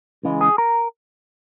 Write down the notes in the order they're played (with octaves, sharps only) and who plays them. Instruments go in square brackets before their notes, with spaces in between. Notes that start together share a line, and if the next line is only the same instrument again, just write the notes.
[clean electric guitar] C#2 C#3 E3 G#3
G#4
A#4